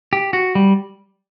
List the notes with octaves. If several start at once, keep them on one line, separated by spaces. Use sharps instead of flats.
G4
F#4
G3